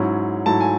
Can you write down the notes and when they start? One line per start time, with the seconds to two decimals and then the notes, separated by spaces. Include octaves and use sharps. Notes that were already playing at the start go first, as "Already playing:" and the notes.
Already playing: G#2 F#3 C#4 E4
0.46 G#2 F#3 A3 E4 A5
0.61 G#5